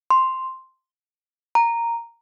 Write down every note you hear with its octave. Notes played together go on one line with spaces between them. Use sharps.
C6
A#5